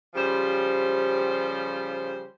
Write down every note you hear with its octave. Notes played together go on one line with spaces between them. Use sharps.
C#3 F3 G3 G4 C5